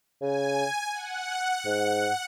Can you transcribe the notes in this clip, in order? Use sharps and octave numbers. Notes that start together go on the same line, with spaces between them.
C#3 G#5
F#5
G#2